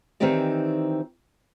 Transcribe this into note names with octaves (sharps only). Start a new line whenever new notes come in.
D#3 E3 C4 D#4 G4 D5